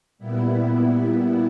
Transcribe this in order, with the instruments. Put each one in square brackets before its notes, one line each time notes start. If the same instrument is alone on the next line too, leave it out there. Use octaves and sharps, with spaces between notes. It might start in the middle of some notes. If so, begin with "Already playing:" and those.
[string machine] A#2 G3 B3 E4